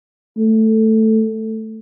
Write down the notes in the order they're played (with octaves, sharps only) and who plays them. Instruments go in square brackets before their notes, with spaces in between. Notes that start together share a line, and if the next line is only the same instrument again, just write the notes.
[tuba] A3